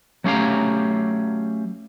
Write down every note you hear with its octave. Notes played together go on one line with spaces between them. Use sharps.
F#3 A3 C#4 G4 F5 A#5